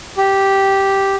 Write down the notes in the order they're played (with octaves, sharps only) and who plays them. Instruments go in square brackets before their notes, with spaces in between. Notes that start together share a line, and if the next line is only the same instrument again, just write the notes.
[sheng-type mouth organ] G4